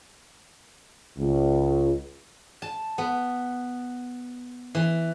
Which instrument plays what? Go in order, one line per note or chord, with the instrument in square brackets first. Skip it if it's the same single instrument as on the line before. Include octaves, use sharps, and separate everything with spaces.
[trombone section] C#2
[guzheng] A5
B3
E3